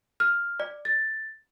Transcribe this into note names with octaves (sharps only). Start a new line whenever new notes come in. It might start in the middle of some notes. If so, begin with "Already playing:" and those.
F6
D5
A6